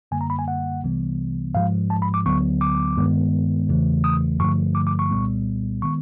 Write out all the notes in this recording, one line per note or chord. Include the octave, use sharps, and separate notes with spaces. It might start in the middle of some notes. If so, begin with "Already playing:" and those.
F#2 D3 G3 A#3 G#5
A#5
B5
G#5
F#5
C2 C3 E3 G3 B3
G#2 F3 G#3 F5
A5
B5
D6
D2 D3 F#3 B3 C#6
D6
G2 D#3 G#3 B3
E2 C#3 E3 A3
D#6
G2 D3 F3 A3 C#6
D6
D6
C#6
C2 A#2 G3 B3
D#3 G#3 B3 C#6